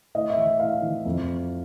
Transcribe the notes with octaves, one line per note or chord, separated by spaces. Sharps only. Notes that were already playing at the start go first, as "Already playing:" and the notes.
A2 D#5
E5
E3
A2 F5
E3
F2